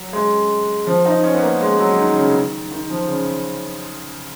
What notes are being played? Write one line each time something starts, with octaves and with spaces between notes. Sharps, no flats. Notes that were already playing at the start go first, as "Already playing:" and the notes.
Already playing: F#3
G#3
F3
D#4
C#4
B3
A#3
G#3
F#3
D#3
C#3
D#3
D#3
F3
C#3